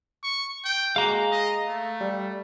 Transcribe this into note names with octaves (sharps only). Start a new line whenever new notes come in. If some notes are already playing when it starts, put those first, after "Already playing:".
C#6
G5
G#3 F#4 F5 A#5
D#5
A3
G3